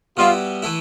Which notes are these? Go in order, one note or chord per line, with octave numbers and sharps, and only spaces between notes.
B2 G3 B3 E4 F4
E3 A3 E4